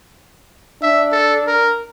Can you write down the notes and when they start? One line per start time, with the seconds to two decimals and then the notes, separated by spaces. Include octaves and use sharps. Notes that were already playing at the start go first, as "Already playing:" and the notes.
0.82 D4 E5
1.12 A4
1.47 A#4